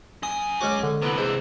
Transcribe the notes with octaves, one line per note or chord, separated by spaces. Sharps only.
F#2 G#5 D#6
G#3 C#4 F#4 D6
D3
C3 E3 B3
G#3 C5